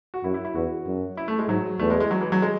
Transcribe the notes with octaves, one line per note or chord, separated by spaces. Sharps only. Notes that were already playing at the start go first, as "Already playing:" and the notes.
F#4
F#2 E4
E4
E4
E2 F#4
F#2
E4
A3
G#3
G#2 F#3
E2 A3
G#3
G#3
F#3
E3
F#3
G#3